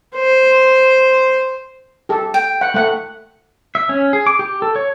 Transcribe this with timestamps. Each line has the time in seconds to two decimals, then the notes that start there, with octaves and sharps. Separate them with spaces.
0.16 C5
2.09 G4 A4
2.34 G5
2.61 F#5
2.74 A3 F#5
3.75 E5
3.89 C#4
4.13 G#4
4.27 D6
4.39 G4
4.62 A4
4.76 C#5